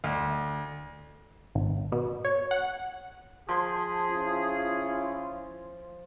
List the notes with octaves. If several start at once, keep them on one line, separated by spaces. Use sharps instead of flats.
D2
G#1
B2
C#5
F#5
F3 G#4 C6
C#4 E4 F4